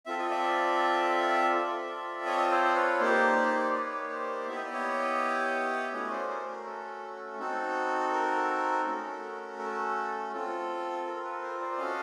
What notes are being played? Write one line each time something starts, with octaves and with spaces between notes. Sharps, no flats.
C4 F4 A4 E5
D#5
D5 E5
C4 F4 A4
C#5 D#5
C5 D5
D5
B4 C#5
A#3 D#4 G4 C5 D5
C5 D5
B4 C#5
C5 D5
B3 E4 G4 E5
D#5
D5
C#5 D#5
A3 C#4 F#4 C#5 D#5
C5 D5
A#4 C5
A#4
A4
C4 D#4 F#4 A4
A#4
A3 C#4 F#4 A4
A4
C4 F4 A4
A#4
A4 B4
A#4 C5
C5 D5
C#4 F#4 A4 D#5 F5